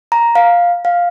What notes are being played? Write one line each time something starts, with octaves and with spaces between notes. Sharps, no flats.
A#5
F5
F5